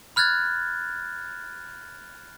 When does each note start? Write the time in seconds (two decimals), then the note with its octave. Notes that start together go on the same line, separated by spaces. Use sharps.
0.16 B5 F6 F#6 G#6 A6